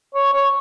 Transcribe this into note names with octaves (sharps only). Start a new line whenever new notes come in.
C#5
C#5